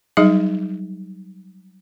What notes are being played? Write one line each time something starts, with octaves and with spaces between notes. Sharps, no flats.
F#3 G3 D#4 G#4 D#5